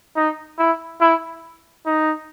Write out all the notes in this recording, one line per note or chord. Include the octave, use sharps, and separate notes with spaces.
D#4
E4
E4
D#4